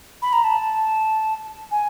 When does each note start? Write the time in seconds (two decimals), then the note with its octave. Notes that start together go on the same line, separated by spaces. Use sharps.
0.22 B5
0.33 A#5
0.44 A5
1.71 G#5